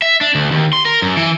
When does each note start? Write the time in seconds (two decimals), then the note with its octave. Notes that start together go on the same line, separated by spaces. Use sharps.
0.02 E5
0.21 D4
0.35 D2
0.51 D#2
0.73 C6
0.85 A#4
1.02 F#2
1.17 E3